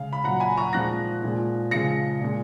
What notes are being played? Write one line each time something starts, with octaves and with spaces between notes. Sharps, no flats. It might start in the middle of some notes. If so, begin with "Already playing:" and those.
Already playing: C#3 G#3 F5
B5
A#2 F#3 F#5 A#5
G#5 B5
A#5 C#6
A#2 F3 G#3 F#6 A#6
A#2 F3 G#3
C#3 F3 G#3 A#6 C#7
A#2 G#3